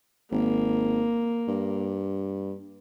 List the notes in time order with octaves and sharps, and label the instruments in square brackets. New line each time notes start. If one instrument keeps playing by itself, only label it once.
[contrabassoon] G#1 [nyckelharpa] A#3
[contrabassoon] G2